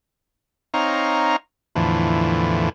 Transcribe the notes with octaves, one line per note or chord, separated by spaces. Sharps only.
C4 D#4 C#5 F5 A#5
E2 A2 D3 E3 F3